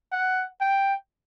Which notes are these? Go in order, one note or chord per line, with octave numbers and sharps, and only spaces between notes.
F#5
G5